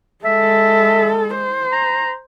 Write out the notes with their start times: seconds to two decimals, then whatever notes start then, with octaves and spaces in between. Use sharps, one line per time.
0.25 G#3 A4 E5
1.34 C5
1.72 A#5